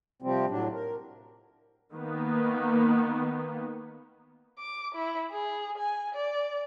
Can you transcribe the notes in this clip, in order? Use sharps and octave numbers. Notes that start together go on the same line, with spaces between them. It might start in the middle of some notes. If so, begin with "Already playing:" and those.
C3 F3 G3 C4
A2 F#3 D4
A#4
D#3 A#3 B3
D6
E4
G#4
G#5
D5